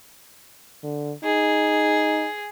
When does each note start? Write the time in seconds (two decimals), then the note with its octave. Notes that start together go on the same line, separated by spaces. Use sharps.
0.84 D3
1.24 D#4 G#4